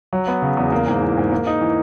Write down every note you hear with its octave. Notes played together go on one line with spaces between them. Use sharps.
F#3
B3
C#3
E2
A#3
G#2
E3
G#2
A#3
D#4
E3